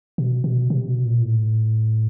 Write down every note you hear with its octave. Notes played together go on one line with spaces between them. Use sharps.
B2
B2
C3
B2
A#2
A2